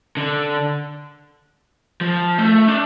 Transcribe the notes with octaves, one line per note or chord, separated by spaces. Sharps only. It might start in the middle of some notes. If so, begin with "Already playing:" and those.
D3
F3
A3
D4